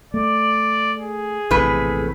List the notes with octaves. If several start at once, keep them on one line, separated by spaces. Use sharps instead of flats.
A3 D5
G#4
A#1 E2 A2 C3 B4